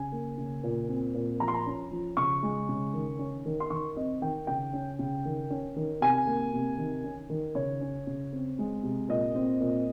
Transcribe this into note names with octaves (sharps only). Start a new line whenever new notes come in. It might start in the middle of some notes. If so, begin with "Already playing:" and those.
Already playing: C#3 G#5
A#3
C#3
A#2
C4
A#2
F3 A#5
C6
A#5
C#4
F3
C#3 C#6
G#3
C#3
D#3
C#4
D#3
C6
D#3 C#6
C4 D#5
D#3 G5
C#3 G5
C#4
C#3
D#3
C#4
D#3
C3 G#5
A#3
C3
D#3
C#4
D#3
C#3 C#5
C#4
C#3
C4
G#3
C3
A#2 D#5
C4
A#2